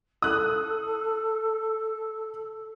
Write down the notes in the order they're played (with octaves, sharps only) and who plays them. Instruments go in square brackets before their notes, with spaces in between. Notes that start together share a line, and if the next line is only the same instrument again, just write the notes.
[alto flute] A4 [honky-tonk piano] D#6 F#6